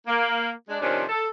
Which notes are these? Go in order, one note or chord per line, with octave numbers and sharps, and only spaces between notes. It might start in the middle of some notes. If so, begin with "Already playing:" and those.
A#3
G#3 D4
C3 D#3 F3 C#4 D4
A4